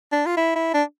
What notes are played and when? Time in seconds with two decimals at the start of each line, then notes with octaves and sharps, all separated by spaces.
0.12 D4
0.26 F4
0.37 E4
0.56 E4
0.74 D4